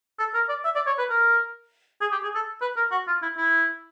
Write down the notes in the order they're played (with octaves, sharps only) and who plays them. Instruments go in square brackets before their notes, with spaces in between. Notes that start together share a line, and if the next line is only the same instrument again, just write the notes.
[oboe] A4
A#4
D5
E5
D5
C#5
B4
A#4
G#4
G4
G#4
A4
B4
A#4
F#4
F4
E4
E4